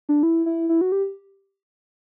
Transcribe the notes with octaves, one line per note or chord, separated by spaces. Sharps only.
D4
E4
E4
E4
F#4
G4